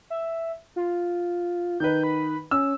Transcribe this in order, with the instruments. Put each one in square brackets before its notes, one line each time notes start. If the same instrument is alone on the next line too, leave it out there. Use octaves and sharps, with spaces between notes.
[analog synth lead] E5
F4
[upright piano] D#3 D#4 B4 [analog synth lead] G6
[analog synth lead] B5
[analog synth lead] C#4 [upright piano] E6